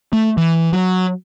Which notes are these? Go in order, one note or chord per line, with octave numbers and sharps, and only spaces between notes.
A3
E3
F#3